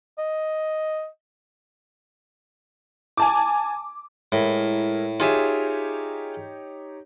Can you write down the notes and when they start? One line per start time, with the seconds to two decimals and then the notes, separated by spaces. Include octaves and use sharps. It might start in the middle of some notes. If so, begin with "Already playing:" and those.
0.19 D#5
3.17 G#5 A5 D6
4.32 A2 G#3 E4 A#4
5.20 D#4 F4 G4 G#4 C#5 E5